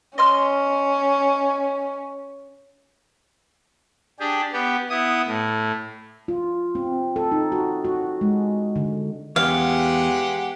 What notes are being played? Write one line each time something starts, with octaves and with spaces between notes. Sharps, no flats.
C#4 D#5 C6 F6
D4 G4 G#4
B3 G4
B3 E4 D#6
A2
F4
C4
A4
D#4
F#4
F#4
G#3
D3
E2 G#3 B3 G4 F5 F#5